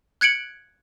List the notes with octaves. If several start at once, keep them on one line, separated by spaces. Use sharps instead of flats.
F#6 G#6 C#7 D7 F#7